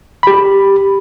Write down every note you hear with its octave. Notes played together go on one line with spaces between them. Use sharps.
G4 B5